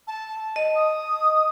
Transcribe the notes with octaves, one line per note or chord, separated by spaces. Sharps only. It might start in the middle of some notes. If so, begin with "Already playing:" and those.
A5
D#5 A5
D#6